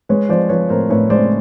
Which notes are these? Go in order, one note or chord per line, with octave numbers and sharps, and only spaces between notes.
G#3 B4 C#5
F3 C5 D5
F3 B4 C#5
A2 A#4 C5
A2 B4 C#5
G#3 C5 D5